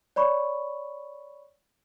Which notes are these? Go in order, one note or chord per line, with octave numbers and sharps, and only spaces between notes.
C#5 D5 B5 C#6